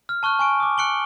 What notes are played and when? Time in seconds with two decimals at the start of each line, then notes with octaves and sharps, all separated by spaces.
0.09 F6
0.23 A5 C#6 F6 F#6
0.39 G#5 C#6 D7
0.60 D6 D#6
0.78 F#6 C#7 D7 F#7 G7